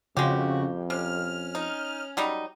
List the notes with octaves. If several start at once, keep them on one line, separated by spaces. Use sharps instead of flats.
F2 C#3 G#3 F#4 G4
C3 C#4 F6
D#4
F#3 G3 D#4